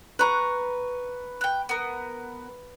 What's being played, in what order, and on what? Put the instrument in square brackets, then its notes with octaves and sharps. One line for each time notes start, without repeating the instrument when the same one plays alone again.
[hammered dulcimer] B4 C#6 [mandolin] A#5 F#6
[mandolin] G5 F#6
B3 A#4